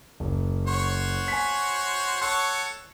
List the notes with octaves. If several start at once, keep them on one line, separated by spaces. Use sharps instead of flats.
F#1
F#4 C5 C#5
G#5 B6
A4 C#5 F#5 C7